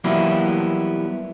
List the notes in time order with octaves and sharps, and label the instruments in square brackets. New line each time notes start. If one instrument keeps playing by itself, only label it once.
[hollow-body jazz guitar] E3 F#3 G3 A#3 B3 E4